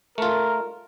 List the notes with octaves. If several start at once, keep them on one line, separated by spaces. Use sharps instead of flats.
A3 F4 A#4